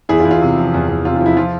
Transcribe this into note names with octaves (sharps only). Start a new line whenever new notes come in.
E2 E4 G#4
F4
E2
F4
C3
F3
E2
E2
C3 F4
F3 F4
E4
F3 F4